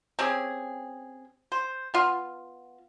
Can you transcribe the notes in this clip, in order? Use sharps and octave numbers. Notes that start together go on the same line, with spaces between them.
C4 C#4 G4 G#4
C5
B3 F4